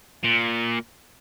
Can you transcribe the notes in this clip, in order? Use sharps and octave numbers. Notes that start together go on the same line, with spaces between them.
A#2